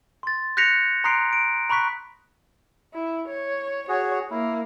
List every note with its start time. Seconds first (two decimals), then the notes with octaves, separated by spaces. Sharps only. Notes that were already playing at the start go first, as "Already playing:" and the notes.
0.23 C6 A6
0.57 F#6 G6 A#6 B6 C#7 F7
1.04 A#5 C6 D#6 F#6 C7 D7
1.33 D7
1.70 A#5 B5 C#6 F#6 B6
2.93 E4
3.28 C#5
3.89 F#4 G#4 C#5
4.31 A#3 E4